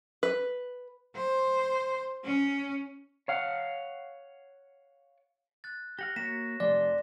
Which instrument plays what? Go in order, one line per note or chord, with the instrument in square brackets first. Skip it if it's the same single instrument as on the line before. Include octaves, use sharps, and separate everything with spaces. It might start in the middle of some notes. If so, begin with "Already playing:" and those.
[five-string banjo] B4
[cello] C5
C#4
[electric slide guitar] C#5 F5 F#5
[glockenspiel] F#6 A6
[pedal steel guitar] G4 F#5 F6 [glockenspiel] A#6
[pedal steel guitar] A#3 F#4 C#5 [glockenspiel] A#6 B6 E7
[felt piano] F1 [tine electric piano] D5 [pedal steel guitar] C6